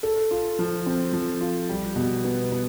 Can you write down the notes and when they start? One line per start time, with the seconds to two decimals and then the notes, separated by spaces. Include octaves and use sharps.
0.03 A4
0.31 F4
0.59 F3
0.86 C4
1.13 F3
1.41 F4
1.69 G3
1.96 B2
2.24 B3
2.52 B3